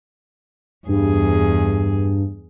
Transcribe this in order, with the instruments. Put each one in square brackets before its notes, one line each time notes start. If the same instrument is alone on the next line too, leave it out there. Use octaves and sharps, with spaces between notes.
[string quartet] E2 G#4 [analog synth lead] G2